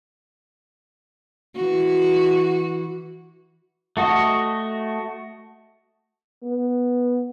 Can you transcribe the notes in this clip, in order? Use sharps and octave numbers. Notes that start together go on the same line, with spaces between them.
E3 F#4
A3 F#4 D#5
B3